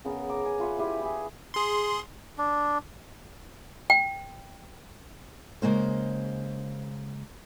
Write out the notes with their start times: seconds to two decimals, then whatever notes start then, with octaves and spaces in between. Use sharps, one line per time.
0.05 C#3 B3 A#4
0.29 A#5 D6
0.46 G#5
0.60 F4 B4 E5 F#5
0.78 E4 G4 G#5
1.00 E4 G#4
1.54 G#4 C6
2.38 D4
3.90 G5
5.62 C#3 G#3 A#3 C5